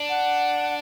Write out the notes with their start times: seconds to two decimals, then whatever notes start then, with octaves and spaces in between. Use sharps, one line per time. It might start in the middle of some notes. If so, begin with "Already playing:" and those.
Already playing: D4
0.09 F#5